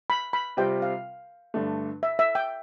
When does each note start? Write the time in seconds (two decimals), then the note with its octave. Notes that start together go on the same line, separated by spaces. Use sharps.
0.10 B5
0.33 B5
0.57 C3 G3 C4 F4 G5
0.82 F5
1.54 G2 D3 A3
2.03 E5
2.19 E5
2.35 G5